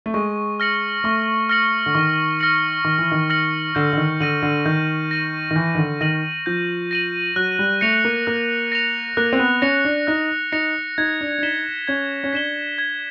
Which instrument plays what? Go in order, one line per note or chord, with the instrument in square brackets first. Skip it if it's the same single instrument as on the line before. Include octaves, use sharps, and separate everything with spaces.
[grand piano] A3
[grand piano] G#3 [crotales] C#6
[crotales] F6 A#6 C#7 F#7
[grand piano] A3 [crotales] C#6
[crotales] F6 A#6 C#7 F#7
[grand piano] D3
[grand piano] D#3 [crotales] C#6
[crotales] F6 A#6 C#7 F#7
[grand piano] D#3 [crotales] C#6
[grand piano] E3
D#3
[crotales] F6 A#6 C#7 F#7
[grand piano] D3 [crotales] G6
[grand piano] D3
D#3
[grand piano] D3 [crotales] A#6 D#7 F#7
[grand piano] D3
[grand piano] D#3 [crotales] G6
[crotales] A#6 D#7 F#7
[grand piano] D#3
[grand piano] E3 [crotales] G6
[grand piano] D#3
D3
[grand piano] D#3 [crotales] A#6 D#7 F#7
[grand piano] F3 [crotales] G6
[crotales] A#6 D#7 F#7
[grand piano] F#3 [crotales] F#6
[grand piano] G3
[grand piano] A3 [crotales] A#6 C#7 F7
[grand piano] A#3
[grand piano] A#3 [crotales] F#6
[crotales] A#6 C#7 F7
[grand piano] A#3 [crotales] F#6
[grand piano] C4
B3
[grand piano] C#4 [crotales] A#6 C#7 F7
[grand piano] D4
[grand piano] D#4 [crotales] F#6
[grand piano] D#4 [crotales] A#6 C#7 F7
[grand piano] D#4 [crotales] G#6
[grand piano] D4
D4
[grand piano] D#4 [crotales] B6 E7 G7
[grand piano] C#4 [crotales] G#6
[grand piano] C#4
[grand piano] D4 [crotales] B6 E7 G7
[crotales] G#6